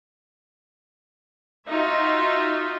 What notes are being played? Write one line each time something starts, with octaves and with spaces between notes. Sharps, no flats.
D#4 F4 F#4 E5